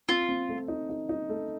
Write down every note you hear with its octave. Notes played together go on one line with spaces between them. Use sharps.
C4 F4
C4
A3
D#4
D#4
D#4
A3